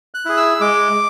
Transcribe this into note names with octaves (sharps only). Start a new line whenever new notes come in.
F#6
E4 G#4
E6
G#3 D6